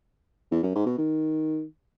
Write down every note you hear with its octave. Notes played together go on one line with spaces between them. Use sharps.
E2
F#2
G#2
B2
D#3